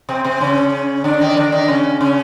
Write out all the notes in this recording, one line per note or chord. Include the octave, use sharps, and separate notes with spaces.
C3 C4
C3 C4
C#3 C#4
D3 D4
D#3 D#4
D3 D4
D#3 D#4
C#3 C#4
C#3 C#4